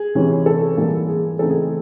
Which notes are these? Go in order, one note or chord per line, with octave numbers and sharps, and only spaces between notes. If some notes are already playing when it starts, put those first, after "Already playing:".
Already playing: G#4
C3 E3 G#3 C#4
A4
G#2 E3 G3 A#3
G#4
C#3 E3 A3 C4 D#4 A4
G#4